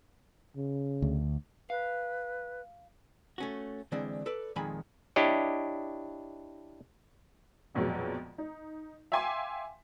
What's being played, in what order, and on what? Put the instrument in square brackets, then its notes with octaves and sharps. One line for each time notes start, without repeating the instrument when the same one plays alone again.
[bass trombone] C#3
[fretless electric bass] D2
[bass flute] B4 [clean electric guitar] F5
[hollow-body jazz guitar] A3 C#4 F#4
D3 E3 G#3 C4 D4
A4 B4 D5
F2 A#2 D#3 G#3 G#5 B5
[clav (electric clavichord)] D4 E4 G4 C#5 D#5
[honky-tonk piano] A#1 F2 B2 F#3 G#3
D#4
E5 F5 G5 G#5 C6 D6